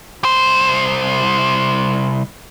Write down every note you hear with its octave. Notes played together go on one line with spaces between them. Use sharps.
C2 C5